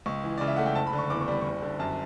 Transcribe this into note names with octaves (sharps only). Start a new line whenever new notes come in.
C#2 C#6
E3
C#3 D5
E5
A3 F#5
G5
F#1 A5
B5
D3
C#6
E2 D6
C#6
G3 B5
F#1 C#6
D3
F#2 A5